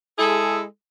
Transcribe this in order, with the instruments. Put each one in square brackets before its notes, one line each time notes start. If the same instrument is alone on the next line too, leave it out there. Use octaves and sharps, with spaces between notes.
[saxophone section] G#3 E4 G#4 A4